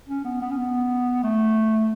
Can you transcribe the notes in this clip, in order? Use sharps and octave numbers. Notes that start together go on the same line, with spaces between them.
C#4
B3
B3
C#4
B3
A3